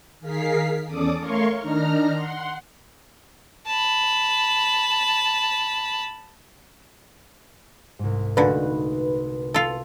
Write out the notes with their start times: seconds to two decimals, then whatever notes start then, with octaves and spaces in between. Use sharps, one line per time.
0.20 D#3 G#4 A#4 F5 B6 C7
0.87 E2 C#4 A4 D5 D6 D#6
1.19 A3 A#4 C#5 F5 C6 C#6
1.59 D#3 D4 D#4 A#5 F6
2.13 F#5 C6
3.66 A5 B5
7.99 C2 G#2
8.37 A#2 D3 A3 D#4 F#4 B4
9.54 F4 A4